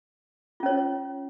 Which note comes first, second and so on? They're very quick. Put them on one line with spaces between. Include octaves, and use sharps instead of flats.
F4 C#4 C#5